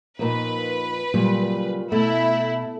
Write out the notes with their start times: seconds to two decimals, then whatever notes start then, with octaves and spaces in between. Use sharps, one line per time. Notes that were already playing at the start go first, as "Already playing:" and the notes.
0.19 F2 A#2 D#4 A#4 B4
1.14 A#2 C#3 F#3 G3
1.92 B2 A3 E4